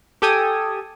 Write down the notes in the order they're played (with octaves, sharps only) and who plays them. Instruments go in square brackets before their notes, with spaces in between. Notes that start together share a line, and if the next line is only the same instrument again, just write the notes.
[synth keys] G4 A4 G5 G#5 D#6